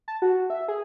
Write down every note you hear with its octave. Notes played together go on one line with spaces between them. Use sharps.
A5
F#4
E5
G#4